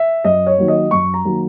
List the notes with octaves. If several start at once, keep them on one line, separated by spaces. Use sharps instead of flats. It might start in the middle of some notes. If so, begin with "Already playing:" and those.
Already playing: E5
F#2 D#5
C#5
D#3 F#3 A#3
D#5
F#2 C#6
A#5
D#3 F#3 A#3